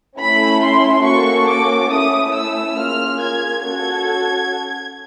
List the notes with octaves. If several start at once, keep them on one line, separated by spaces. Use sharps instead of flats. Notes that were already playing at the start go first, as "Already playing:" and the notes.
A3 C#4 E4 B5
C6
A#3 C#4 F#4 A4 C#6
D6
A3 C#4 E4 D#6
E6
A#3 C#4 F4 G#4 F6
G#6
C#4 F#4 A4 G#6